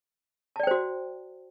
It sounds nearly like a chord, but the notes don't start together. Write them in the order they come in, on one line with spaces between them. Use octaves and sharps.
A5 D5 G5 C5 F#4